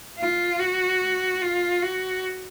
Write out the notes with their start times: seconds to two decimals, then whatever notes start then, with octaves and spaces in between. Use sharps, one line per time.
0.18 F4
0.59 F#4
1.41 F4
1.83 F#4